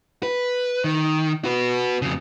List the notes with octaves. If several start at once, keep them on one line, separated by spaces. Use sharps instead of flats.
B4
D#3
F#4 B4
F2 C#3